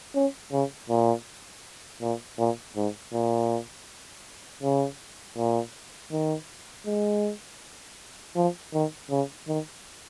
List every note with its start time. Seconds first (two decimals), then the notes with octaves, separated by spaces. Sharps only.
0.15 C#4
0.52 C#3
0.89 A#2
2.02 A#2
2.38 A#2
2.76 G#2
3.13 A#2
4.62 C#3
5.37 A#2
6.12 D#3
6.86 G#3
8.36 F3
8.73 D#3
9.10 C#3
9.47 D#3